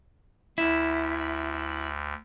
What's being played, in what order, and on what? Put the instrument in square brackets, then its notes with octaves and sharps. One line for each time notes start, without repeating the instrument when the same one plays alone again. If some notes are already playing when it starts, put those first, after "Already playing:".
[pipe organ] D2 [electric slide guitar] E4